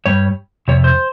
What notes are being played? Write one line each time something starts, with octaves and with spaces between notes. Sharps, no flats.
G2 G3 C#5
F2 C3 C#5
C5